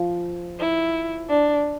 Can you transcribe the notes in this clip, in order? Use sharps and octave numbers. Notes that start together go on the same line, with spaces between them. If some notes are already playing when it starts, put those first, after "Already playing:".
Already playing: F3
E4
D4